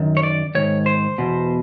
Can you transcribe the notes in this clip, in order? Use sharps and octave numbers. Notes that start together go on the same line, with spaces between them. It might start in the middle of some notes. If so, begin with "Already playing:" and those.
Already playing: F#2 D#3
C#5
D5
G#2 D#3 C#5
C5
E2 B2